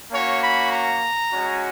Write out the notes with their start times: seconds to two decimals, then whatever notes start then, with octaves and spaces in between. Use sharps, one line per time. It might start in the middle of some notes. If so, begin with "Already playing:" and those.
0.12 A#3 C#4 F#4 C#5
0.41 B5
0.71 A#5
1.31 G#3 C#4 F#4